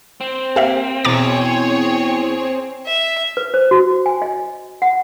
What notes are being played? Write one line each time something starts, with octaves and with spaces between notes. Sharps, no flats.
C4
A#3 G4 E5 F5
E2 B2 G#4 C#5 A#5 D6 A6
E5
B4
C5
F#4
G#5
D#5
F#5